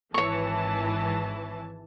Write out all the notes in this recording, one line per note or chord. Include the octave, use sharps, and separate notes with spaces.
G#1 E3 C#5 A5 C#6